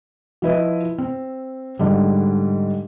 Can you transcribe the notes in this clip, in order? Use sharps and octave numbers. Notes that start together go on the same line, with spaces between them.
F3 E4 B4 D#5
C4
G#2 D3 G3